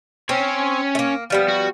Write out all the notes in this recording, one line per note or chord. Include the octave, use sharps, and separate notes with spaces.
C4 C#4 C#5
A3 A#3
F3 G3 B3
F#4